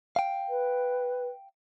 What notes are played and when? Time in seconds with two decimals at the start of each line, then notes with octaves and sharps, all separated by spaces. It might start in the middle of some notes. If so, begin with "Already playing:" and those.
0.16 F5 G5
0.48 B4